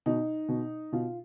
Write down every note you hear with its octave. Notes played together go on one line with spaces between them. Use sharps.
B2 D#4
B2
B2 F4